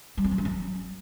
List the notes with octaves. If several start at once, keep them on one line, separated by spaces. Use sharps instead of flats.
G3
C4
F#3
C#4
F#3